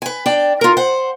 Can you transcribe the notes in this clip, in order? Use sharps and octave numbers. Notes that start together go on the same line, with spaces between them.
B4 G#5
D4 D5 G5
F4 A#4
C5 F#5